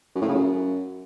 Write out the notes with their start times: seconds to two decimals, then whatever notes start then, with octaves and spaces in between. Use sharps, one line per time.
0.15 F#2
0.21 A2
0.28 C#3
0.34 F#2